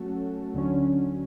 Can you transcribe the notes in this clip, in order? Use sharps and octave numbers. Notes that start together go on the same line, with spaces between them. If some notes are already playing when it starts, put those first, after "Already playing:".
Already playing: F#3 A3 C#4 F#4 A4
D2 D3 F#3 C#4